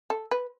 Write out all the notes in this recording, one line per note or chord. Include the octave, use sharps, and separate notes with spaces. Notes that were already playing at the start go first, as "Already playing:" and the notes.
A4
B4